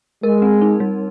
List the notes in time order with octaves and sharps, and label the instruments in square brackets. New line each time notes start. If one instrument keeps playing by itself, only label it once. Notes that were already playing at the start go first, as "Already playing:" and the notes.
[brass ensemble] G#3 [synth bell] A#4
[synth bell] C4
D#4
G3